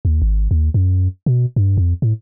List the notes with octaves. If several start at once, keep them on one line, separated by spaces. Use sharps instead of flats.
D#2
G#1
D#2
F#2
B2
G2
F2
A2